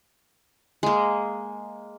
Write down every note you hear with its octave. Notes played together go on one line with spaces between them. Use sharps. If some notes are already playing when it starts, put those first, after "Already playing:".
G#3 A#3